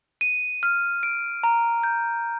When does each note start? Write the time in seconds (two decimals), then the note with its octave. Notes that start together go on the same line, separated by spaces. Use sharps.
0.21 D#7
0.63 F6
1.03 D7
1.43 A#5
1.84 G6